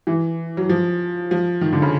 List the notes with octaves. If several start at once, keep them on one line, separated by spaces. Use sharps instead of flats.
E3
F#3
F3
F3
D#3
D3
C#3